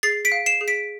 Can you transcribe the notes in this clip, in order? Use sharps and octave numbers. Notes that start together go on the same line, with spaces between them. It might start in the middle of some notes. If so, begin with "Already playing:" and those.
G#4 A6 C7
B6 D7
F5
C7 E7
G#4
B6 D7